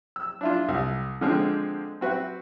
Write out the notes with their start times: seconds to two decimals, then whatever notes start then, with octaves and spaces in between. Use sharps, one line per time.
0.16 E6
0.41 D4 E4 F4
0.68 C2
1.21 D3 F3 G#3 C4
2.01 C4 F#4 B4 E5